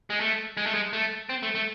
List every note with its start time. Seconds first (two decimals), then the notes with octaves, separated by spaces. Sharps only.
0.10 G#3
0.20 A3
0.57 G#3
0.66 A3
0.74 G#3
0.93 A3
1.29 C4
1.43 A3
1.55 A3